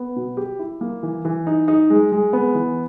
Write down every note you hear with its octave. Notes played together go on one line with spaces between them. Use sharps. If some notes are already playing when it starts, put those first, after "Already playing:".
Already playing: B3
B2
G4
E4
A#3
E3
E3
D#4
D#4
G#3
G#3
B3
E3